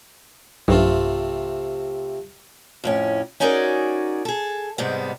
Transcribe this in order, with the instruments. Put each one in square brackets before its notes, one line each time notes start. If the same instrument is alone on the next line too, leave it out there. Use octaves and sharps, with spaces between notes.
[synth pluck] B1 G2 [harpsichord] C3 A3 F4
[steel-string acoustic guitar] F2 A2 C#4
C#4 D#4 F#4 G#4 A#4 D5
G#4 A4
G#2 C3 G3 G#3 B3